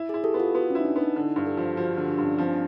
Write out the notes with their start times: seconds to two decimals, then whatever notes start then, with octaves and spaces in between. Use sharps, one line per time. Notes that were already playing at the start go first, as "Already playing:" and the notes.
Already playing: E4
0.09 G#4
0.14 E4
0.24 G4 A4
0.34 B3
0.40 F4
0.55 B3 F#4
0.70 C#4
0.75 D#4 E4
0.85 D4
0.96 B3
1.01 D#4
1.16 D3 E4
1.36 G2
1.46 G4 A4
1.57 F3 G4
1.77 F3 F#4
1.92 G4
1.97 D3
2.08 D4
2.18 G2
2.24 C#4
2.38 F3 C4
2.49 D4